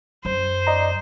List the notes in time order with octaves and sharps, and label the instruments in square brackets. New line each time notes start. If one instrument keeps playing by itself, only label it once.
[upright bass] F#2 [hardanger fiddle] C5
[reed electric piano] D5 D#5 A#5